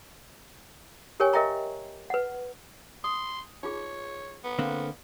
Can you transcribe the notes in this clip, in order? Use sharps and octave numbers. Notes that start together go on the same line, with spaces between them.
G4 A#4 C#5 G5 G#5
A#4 D#5 E5 G5 A#5 C#6
B4 F#5
C6 D#6
D#4 F4 G#4 C#5
B3
D3 A#3 C4